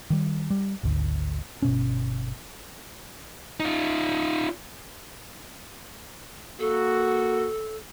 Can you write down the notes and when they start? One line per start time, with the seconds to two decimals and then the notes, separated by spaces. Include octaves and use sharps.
0.10 D#3 G3
0.51 G3
0.83 G#1 D2
1.62 G1 B2 C#4
3.60 D#4 F4
6.60 A#3 F#4 A4